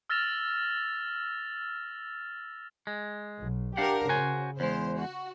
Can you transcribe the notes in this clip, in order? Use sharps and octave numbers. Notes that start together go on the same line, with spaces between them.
E6 F6 A6 A#6 E7 F7
G#3
B1
D4 G4 A#4 F5 F#5
C#3 F#4 C5 G#5
E2 G#3 C5
F#4